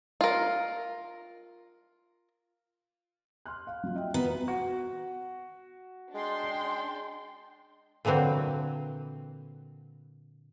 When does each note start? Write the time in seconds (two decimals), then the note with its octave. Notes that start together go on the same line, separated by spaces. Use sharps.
0.21 F4 A#4
3.46 C6 F6 F#6
3.67 F5
3.83 F#3 F4
3.96 D#5 E5 G5
4.14 B3 F4 F#4 A#5
4.48 F#4
6.14 G#3 D4 G5 C6
8.05 A#2 D3 E3 F#3 C4